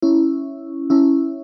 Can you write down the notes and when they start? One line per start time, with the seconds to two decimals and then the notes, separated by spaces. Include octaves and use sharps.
0.02 C#4 E4
0.90 C#4 E4